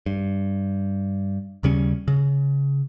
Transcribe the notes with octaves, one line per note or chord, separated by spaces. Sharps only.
G2
D#2 C#3 G3 C#4
C#3